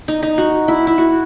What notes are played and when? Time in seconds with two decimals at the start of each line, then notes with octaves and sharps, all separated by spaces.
0.08 D#4
0.23 D#4
0.38 F#4
0.68 E4
0.87 E4
0.98 F#4